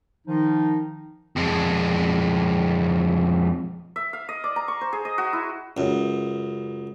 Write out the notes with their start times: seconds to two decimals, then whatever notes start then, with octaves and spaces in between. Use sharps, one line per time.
0.27 D#3 F3 D#4
1.36 F2 G#3
3.96 E5
4.13 F5
4.29 D#5
4.44 D5
4.56 A#5
4.68 C#6
4.81 C5
4.93 G#4
5.05 D#5
5.18 F#4
5.33 E4
5.77 C#2 F#2